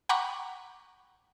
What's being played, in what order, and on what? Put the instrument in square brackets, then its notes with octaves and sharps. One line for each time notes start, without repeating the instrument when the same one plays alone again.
[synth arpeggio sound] F#5 G5 A#5 B5 C#6 D6